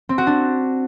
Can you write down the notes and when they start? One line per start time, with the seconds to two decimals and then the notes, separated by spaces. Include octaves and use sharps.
0.09 C4
0.18 F#4
0.27 D4